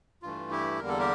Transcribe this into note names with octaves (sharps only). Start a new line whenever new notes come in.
G2 E3 A3 F4
E4 G4
E2 D3 G3 A#3 A#4
A4
G4 A#4